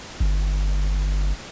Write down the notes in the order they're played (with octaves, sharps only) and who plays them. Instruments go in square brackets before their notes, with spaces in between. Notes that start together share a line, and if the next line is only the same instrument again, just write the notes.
[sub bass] G1